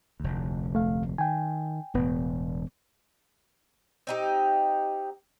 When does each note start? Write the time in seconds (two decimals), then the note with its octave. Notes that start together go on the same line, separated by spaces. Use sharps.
0.20 F1 D2
0.75 A3 F5
1.18 D#3 G5 G#5
1.94 E1 A2 B3
4.07 C4 D#4 G4